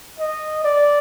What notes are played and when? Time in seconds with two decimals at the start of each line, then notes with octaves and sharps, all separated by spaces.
0.19 D#5
0.64 D5